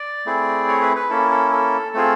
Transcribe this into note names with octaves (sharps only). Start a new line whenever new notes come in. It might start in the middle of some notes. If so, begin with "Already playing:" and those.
Already playing: D5
A3 C4 E4 G#4
C#5
B4
B4
A#3 C#4 E4 A4
A4
A4
A3 C4 F4 G#4